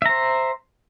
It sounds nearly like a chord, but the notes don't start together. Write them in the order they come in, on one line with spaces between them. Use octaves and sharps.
E5 A#5 C5